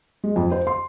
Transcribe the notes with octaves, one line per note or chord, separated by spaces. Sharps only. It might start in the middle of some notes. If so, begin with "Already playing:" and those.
G#3
F2
C5
C6